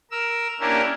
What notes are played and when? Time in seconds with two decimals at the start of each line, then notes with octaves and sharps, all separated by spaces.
0.11 A#4 E6
0.60 A#3 C#4 D4 E4 G4 A#4